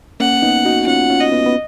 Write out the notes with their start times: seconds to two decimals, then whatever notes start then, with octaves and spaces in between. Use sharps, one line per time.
0.20 A#3 C#4 F#5
0.42 B3 D#4
0.65 D#4 F#4
0.87 C#4 F4 F#5
1.10 C#4 F4
1.21 D#5
1.32 B3
1.46 B3